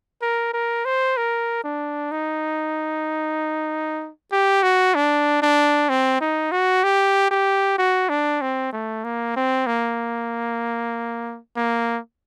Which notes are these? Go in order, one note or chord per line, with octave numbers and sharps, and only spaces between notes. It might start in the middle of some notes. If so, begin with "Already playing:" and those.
A#4
A#4
C5
A#4
D4
D#4
G4
F#4
D4
D4
C4
D#4
F#4
G4
G4
F#4
D4
C4
A3
A#3
C4
A#3
A#3